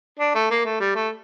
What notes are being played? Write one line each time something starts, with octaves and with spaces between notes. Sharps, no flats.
D4
A3
A#3
A3
G3
A3